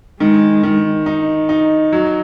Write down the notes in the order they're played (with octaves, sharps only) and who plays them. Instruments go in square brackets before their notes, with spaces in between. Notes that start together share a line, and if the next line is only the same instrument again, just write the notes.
[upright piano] D#3 [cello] G#3
[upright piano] D#3
D#4
D#4
F#3